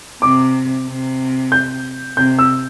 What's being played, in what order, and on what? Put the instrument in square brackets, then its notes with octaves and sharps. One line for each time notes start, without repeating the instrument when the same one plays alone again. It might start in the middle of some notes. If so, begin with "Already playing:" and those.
[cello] C3 [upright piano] D6
[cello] C3
[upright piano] G6
[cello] C3 [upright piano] G6
[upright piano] E6